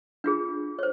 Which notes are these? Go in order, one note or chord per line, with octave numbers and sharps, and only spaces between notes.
D4 F4 G#4
C5 C#5